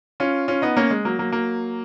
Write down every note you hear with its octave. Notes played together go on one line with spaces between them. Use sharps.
C#4 F4
C#4 F4
B3 D#4
A#3 C#4
G#3
F#3 A#3
F#3 A#3
F#3 A#3